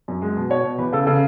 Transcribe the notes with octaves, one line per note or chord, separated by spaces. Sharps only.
F#2
G#3
B2
B2 C#5
B2
E2 B4
C#3 A4
C#3 A4